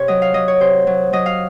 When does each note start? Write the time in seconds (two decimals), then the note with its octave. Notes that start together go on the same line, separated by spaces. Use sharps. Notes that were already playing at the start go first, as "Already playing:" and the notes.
Already playing: C3 C#5
0.08 F#3 D#5
0.22 F5
0.34 F#3 D#5
0.48 C#5
0.60 C3 C5
0.87 F#3
1.13 F#3 D#5
1.26 F5